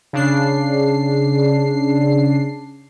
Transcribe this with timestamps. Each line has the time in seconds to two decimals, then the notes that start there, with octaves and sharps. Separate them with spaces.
0.13 C#3 D4 C7